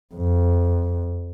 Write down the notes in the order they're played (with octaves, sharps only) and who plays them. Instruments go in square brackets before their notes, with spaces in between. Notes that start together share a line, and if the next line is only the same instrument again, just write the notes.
[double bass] F2